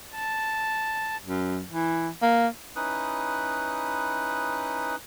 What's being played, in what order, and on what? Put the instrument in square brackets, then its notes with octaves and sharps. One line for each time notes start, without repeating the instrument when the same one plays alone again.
[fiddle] A5
[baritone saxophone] F#2
E3
A#3
[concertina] C#4 D#4 E4 B4 D#6 F#6